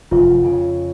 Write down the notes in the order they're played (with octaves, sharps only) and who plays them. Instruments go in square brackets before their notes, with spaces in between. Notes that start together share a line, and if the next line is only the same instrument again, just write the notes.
[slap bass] F1 F#2 [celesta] F4
[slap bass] F2 C#3